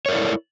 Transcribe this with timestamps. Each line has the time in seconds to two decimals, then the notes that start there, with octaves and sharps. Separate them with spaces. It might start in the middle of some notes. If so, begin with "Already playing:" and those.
0.06 C#5
0.09 A#4
0.11 D5
0.14 E4
0.17 A4